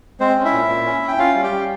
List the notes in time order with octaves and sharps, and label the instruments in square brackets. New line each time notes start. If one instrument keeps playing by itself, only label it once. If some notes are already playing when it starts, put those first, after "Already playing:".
[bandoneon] G#3 C4 C5
C#4
E4 E5
A#2
A#2
C#4
C#4
G5
C#4 F4 F5
G3
G4 G5
G3